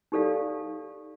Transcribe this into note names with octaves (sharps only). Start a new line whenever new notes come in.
D#4 G4 A4 D5 F5